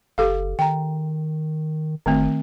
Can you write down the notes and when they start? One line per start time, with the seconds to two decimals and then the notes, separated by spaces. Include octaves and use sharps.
0.18 F#1 G4 A4 F5
0.59 D#3 G5 A#5
2.06 G1 D#3 A3 C4